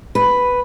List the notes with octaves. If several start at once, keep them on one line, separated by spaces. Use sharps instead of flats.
B4